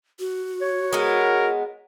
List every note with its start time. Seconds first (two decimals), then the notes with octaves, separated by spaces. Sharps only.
0.20 F#4
0.61 C#5
0.93 G#3 B3 A#4